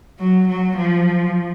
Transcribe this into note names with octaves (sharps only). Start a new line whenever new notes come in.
F#3
F#3
F3